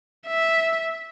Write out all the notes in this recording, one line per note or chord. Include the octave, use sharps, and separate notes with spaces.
E5